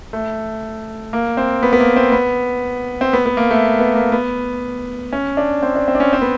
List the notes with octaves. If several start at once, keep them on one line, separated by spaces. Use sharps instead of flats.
A3
A#3
C4
B3
B3
A#3
C4
B3
C4
B3
B3
A#3
A3
B3
A#3
B3
C#4
D4
C4
D4
C4
D4
C#4
C4
B3